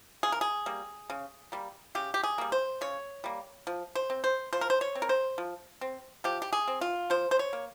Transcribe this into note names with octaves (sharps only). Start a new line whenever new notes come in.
C#3 G#4
A#4
G#4
G3 A#3
C#3
G3 A#3
C#3 G4
G4
G#4
G3 A#3
C5
C#3 C#5
G3 A#3
F3
C5
C4
C5
F3 C5
A#4
C5
C#5
C4
A#4
C5
F3
C4
F3 G4
G4
G#4
C4
F4
F3 C5
C5
C#5
A#3